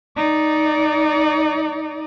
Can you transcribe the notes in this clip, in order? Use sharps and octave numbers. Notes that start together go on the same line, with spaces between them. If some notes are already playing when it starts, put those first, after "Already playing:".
D#4 D5